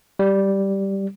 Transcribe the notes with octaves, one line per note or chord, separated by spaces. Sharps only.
G3